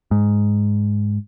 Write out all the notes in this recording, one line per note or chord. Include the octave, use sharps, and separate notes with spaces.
G#2